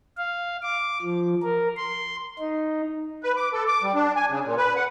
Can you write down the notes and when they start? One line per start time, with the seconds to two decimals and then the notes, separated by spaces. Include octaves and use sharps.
0.18 F5
0.62 D6
1.02 F3
1.43 A#4
1.77 C6
2.39 D#4
3.24 B4
3.37 D6
3.53 A4
3.67 D6
3.83 G3
3.94 D4
4.16 G#5
4.29 C#3
4.45 A#2
4.57 B4
4.76 F#5